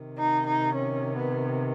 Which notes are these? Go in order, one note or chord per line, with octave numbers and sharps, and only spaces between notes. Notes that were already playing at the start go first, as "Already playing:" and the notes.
Already playing: C3 D#3
D#4
D#4
C#4
B3